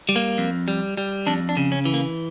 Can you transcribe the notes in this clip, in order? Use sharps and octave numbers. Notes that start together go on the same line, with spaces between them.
G3
A#3
F2
G3
G3
F2 D4
D4
C#3
C#4
E3
A#3